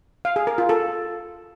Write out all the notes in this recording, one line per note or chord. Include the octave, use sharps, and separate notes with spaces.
F5
G#4
A#4
F4
A4